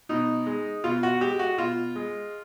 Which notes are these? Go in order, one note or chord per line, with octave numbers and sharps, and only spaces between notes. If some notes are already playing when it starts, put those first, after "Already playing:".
B2 D#4
G#3
B2 F4
F#4
G#3 G4
F#4
B2 F4
G#3